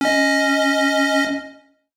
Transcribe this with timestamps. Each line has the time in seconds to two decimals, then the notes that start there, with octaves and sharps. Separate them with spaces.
0.01 C#4 D#5